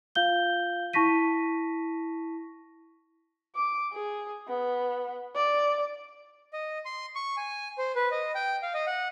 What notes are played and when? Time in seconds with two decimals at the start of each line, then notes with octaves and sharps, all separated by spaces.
0.15 F4 F5 G6 G7
0.93 E4 A5 C#6 A#6 B6 D#7
3.55 D6
3.93 G#4
4.48 B3
5.35 D5
6.53 D#5
6.85 C6
7.16 C#6
7.37 G#5
7.78 C5
7.96 B4
8.11 D#5
8.35 G5
8.62 F5
8.74 D#5
8.87 F#5